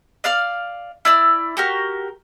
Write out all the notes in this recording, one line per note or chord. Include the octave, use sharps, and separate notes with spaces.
D5 F5 F6
E4 D5 E6
F#4 G4 A#4